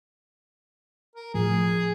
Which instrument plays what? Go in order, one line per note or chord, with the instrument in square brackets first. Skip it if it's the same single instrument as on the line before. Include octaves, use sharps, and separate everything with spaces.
[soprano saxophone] A#4
[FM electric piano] A2 F3 [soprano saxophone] G#4